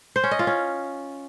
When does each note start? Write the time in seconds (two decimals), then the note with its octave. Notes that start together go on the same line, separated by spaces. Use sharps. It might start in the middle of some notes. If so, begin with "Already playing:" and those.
0.16 C5
0.24 C#4
0.31 D#5
0.39 F4
0.47 C#4